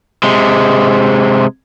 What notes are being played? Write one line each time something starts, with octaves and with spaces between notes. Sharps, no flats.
C3 G#3